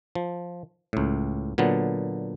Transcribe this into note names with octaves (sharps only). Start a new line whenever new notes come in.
F3
C#2 A2
A#2 D3 F#3 B3